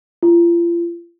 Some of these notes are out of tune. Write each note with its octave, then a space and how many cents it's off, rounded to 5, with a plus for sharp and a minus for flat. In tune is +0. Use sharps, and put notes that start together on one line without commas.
F4 -35